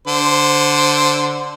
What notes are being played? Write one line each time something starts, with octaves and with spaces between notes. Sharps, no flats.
D3 C5